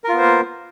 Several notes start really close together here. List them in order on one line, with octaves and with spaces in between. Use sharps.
A#4 F4 B3 C5 A#3